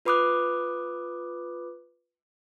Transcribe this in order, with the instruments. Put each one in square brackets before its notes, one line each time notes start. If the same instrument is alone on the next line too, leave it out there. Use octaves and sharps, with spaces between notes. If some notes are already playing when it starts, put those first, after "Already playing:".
[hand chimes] F4 B4 B5 D6 D#6 F#6